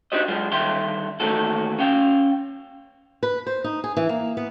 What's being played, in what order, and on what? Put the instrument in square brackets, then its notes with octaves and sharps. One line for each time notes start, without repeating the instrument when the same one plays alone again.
[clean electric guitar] D4 D#4 F#4 G4 C5 D#5
F#3 G#3 F4 G#4
G2 D3 D#3 E5 G5 C6
D#2 D#3 E3 A3 F#4 A4
C#4 F5 G5
[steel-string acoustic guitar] B4
C5
D#4
G#4
E3
A#3
B3